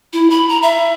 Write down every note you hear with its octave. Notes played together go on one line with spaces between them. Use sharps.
E4
B5
A#5
E5